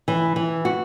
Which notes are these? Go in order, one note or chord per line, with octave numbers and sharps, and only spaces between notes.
E3
E3
F#4